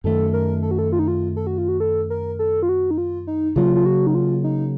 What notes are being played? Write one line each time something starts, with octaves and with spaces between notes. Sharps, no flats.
F#2 D#3 A3 A4
A#4
A4
F#4
A4
F4
D#4
F4
A4
F#4
F4
F#4
A4
A#4
A4
F4
F#4
D#4
F4
D#4
C#3 F#3 A#3 F4
F4
F#4
D#4
F4
D#4